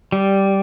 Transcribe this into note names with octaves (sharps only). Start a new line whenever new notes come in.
G3